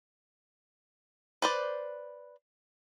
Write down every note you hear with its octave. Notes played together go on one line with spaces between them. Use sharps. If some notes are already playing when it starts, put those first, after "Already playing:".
B4 C5 D5